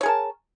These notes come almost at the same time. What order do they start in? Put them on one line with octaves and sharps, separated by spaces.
C#5 G#4 A#4 A5